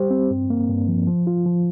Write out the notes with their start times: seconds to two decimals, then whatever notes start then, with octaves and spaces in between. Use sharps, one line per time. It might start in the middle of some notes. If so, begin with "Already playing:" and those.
Already playing: G3 G4 C5
0.10 C4
0.31 G2
0.50 A#3
0.69 G2
0.88 F3
1.07 F3
1.27 F4
1.46 F3